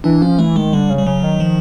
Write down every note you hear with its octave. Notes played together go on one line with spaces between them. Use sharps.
E3 D4
F3 C#4
E3 A3
D#3 G#3
D3 G3
C#3
G3
C#3 F#3
D#3
F3